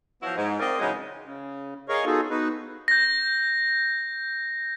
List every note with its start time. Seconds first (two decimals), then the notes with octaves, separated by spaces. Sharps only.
0.22 F3 F#3 B3 E4 F#4
0.36 G#2
0.59 C4 F4 A#4 D5 D#5
0.79 C#3 E3 F#3 G#3 D#4
1.24 C#3
1.89 G#4 A#4 C#5 D#5 F5 C#6
2.05 B3 D#4 F4 F#4 G#4 A4
2.30 B3 D#4 F#4 B4
2.88 G6 A#6